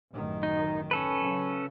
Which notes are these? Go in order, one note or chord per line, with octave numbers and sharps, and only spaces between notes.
A1 F#2 D#3
D#4
C#4 A4 B4
C#3 F#3